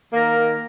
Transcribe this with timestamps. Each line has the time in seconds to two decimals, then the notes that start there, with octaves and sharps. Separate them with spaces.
0.13 D#3 A#3 A#4
0.36 D#3